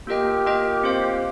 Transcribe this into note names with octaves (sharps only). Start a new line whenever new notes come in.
A#3 F4 G4 A#4 D#5 G5
A#3 F4 A#4 D#5 G5
C4 F4 C5 F5